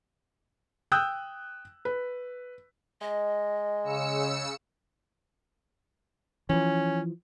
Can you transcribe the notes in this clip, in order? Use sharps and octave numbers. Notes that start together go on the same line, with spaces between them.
G5 D#6 E6 F#6 G6
B4
G#3 D#5
C#3 E6 C#7
E3 F3 C#4